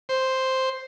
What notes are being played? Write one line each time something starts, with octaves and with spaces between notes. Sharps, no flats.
C5